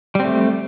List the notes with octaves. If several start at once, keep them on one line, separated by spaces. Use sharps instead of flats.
G3 A3 C4